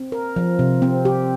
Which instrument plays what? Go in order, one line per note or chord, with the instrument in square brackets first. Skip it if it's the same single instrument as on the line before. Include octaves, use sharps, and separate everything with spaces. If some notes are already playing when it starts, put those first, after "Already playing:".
Already playing: [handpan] C4
A#4
F3
C3
C4
G4